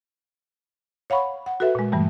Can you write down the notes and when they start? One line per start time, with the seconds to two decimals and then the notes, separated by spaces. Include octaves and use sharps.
1.10 C#5 F5 F#5 B5 C#6
1.46 F#5
1.60 F#4 A4 B4 E5
1.75 A#2 G#3
1.92 G2 E3 G3 A3